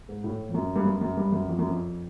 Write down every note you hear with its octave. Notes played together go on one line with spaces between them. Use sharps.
G#2
A2
F2
F#2
G2
F#2
F#2
G2
F#2
F2
F#2
F2